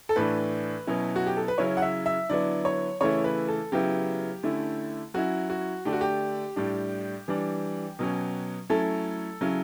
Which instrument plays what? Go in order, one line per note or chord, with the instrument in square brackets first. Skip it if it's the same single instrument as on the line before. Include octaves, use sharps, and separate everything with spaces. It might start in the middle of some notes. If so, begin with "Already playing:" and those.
[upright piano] A4
A2 E3 A3 D4 B4
B2 F#3 C#4 E4
F#4
G4
A4
B4
C#3 F#3 C#4 E4 C#5
F#5
E5
E5
D3 F#3 B3 E4 D5
C#5
C#3 E3 A3 E4 C#5
B4
A4
C#3 F#3 B3 E4 G4
D3 A3 C#4 E4
F#3 C#4 E4 F#4
F#4
D3 A3 D4 G4
F#4
G4
A2 G3 D4
E3 G3 D4
B2 F#3 C#4
F#3 A3 C#4 E4 A4
C#3 F#3 C#4 E4